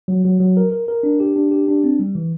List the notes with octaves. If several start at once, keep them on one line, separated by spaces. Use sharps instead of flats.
F#3
F#3
F#3
A#4
A#4
A#4
D4
G4
D4
G4
D4
C4
G3
E3